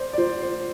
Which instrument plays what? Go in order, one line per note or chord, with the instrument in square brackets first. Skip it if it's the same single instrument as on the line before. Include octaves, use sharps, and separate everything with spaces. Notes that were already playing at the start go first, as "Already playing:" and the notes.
Already playing: [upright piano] C5 D5
D5
[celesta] F4 [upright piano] C5
[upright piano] C5